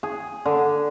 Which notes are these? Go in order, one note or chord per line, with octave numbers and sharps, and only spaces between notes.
G#4
D3